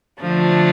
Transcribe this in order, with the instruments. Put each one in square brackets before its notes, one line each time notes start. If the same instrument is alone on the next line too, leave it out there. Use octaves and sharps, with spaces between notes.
[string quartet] D3 A3 D4 [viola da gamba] F3